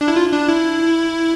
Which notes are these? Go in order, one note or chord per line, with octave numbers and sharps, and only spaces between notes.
D4
E4
F4
D4
E4